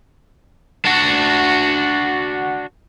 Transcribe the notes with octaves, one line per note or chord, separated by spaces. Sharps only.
D4 F#4